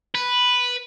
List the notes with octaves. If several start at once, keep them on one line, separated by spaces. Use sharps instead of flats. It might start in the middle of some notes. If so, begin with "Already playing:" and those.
B4